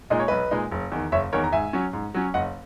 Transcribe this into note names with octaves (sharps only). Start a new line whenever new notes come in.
A#2 G#3 D#4 D#5
C#5
B1 B4 D#5
A#2 G#3 D#4
F#1
E2 D#3
F#1 C#5 E5
E2 D#3 A#4 C#5
A#5
G#2 E5 G#5
F#3 C#4
G#2
F#3 C#4
F#1 D#5 F#5